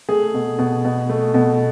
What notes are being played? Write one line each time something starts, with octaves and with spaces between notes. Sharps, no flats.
A3 G#4
B2
B2
B2
A3
B2